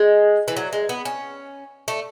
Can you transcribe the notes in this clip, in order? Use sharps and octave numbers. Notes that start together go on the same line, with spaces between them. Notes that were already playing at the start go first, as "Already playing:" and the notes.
Already playing: G#3
E3
F#3
G#3
B3
C#4
A3